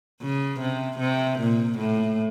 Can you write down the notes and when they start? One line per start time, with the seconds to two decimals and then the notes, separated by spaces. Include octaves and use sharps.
0.22 C#3
0.60 C3
0.99 C3
1.39 A#2
1.78 A2